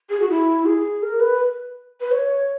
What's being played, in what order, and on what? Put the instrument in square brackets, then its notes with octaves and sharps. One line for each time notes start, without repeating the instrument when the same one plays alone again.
[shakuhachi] G#4
F#4
E4
G#4
A#4
B4
B4
C#5